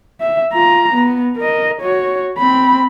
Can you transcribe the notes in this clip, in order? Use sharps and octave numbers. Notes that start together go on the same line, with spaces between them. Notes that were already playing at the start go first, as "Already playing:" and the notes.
E5
F4 A#5
B3
A#4 D#5
F#4 C#5
C4 B5